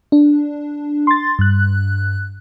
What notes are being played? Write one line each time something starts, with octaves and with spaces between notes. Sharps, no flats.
D4
C6 A6
G2 F#6